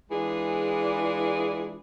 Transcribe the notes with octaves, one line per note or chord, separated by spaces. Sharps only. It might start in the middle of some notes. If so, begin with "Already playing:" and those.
E3 G#3 D4 F4 G#4